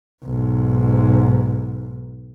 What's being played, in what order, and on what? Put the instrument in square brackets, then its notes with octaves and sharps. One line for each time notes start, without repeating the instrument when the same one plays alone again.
[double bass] B1 G#2